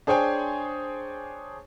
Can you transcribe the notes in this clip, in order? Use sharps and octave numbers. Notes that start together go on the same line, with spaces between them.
D4 G#4 C5 C#5 G5 G#5